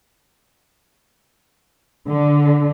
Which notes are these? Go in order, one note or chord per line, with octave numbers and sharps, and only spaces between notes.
D3